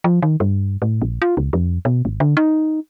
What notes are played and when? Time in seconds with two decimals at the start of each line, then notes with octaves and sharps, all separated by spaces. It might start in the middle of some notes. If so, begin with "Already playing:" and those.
0.04 F3
0.22 D#3
0.40 G2
0.82 A2
1.02 A#1
1.22 F4
1.37 C#2
1.53 F2
1.85 B2
2.05 G#1
2.20 D3
2.37 D#4